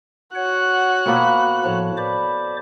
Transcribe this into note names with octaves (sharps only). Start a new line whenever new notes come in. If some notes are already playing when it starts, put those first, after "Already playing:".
F#4 C#5 F#5 F#6
B2 A#3 F4 C5 G5 B5
A2 F3 A3 C#5 A5
B4 C5 D5 D6